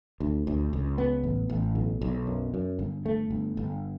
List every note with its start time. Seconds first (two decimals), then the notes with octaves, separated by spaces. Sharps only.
0.20 D2
0.47 D2
0.73 C#2
0.98 B3
1.24 A1
1.50 A1
1.75 B1
2.02 B1
2.27 F#2
2.54 F#2
2.79 G1
3.06 A3
3.31 G1
3.57 G1